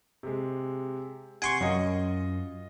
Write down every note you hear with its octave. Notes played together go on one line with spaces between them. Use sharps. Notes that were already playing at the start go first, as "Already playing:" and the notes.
C3 G#3
C3 F#5 G#5 C6 C#6 D7
F#2 F4 D#5